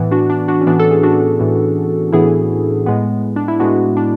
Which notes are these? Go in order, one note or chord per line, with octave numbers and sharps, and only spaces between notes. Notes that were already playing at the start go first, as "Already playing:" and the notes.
Already playing: A2 E3 B3
D4 F#4
D4
D4 F#4
C#4
A2 E3 B3 D4
A4
G#4
D4 F#4
A2 E3 B3
A2 E3 B3 E4 G#4
A2 G#3 B3
D4
E4
A2 G#3 B3 D4 F#4
D4